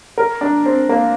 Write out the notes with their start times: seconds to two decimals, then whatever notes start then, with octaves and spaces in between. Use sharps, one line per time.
0.18 A#4
0.41 D4
0.66 C4
0.89 A#3